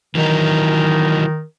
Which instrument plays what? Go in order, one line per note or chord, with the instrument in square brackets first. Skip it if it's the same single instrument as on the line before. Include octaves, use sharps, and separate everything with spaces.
[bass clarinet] D#3 [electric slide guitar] E3 F#3 D#4